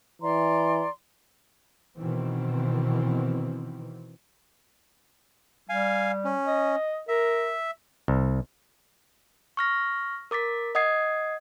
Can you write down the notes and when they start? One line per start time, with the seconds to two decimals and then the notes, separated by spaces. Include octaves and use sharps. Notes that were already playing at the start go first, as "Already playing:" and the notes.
0.22 E3 D5 A#5 C6
1.97 B2 D#3 E3 B3 C4
5.69 G3 F5 G#5
6.25 C#4
6.47 D#5
7.08 A#4 E5
8.08 C2
9.57 C#6 F6 A#6
10.31 A#4 D6 A6 B6
10.75 D#5 F#5 D#6 G#6 C7